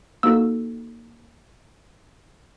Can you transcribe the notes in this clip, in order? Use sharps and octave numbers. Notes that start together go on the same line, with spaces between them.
A#3 D#4 F#4 A4 E6